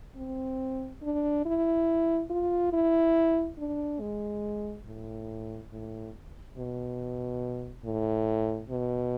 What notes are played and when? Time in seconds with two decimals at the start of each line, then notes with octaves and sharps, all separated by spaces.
0.17 C4
1.03 D4
1.45 E4
2.30 F4
2.73 E4
3.59 D4
4.00 G#3
4.87 A2
5.71 A2
6.58 B2
7.85 A2
8.70 B2